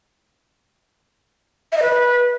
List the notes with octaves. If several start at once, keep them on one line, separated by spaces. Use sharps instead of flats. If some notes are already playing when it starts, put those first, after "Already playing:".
E5
D#5
B4